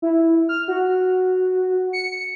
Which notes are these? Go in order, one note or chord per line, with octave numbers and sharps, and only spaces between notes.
E4
F6
F#4
C#7